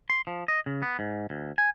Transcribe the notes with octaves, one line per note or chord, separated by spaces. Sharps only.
C6
F3
D#5
C#3
B3
G#2
D2
G#5